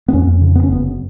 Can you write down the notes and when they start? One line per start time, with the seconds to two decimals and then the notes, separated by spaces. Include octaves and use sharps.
0.08 B3
0.13 F2 C#4
0.41 C#3
0.55 B3
0.63 C#4
0.69 F#1 B3